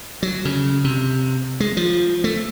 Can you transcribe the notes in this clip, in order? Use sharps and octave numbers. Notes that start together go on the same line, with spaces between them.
F#3
C#3
C3
G#3
F3
A3